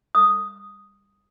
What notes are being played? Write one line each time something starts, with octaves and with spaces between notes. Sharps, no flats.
D#6